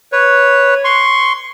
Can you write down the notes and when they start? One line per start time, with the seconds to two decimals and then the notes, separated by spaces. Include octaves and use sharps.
0.12 B4 C#5
0.84 C6 C#6